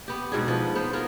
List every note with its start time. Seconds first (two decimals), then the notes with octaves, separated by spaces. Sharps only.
0.08 B3 G4
0.32 G#2 B2 D4 G#4
0.48 F3 B4
0.75 B3 C5
0.93 B3 F4 G#4 A#4